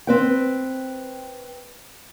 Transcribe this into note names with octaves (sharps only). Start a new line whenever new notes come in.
C4 B4 G5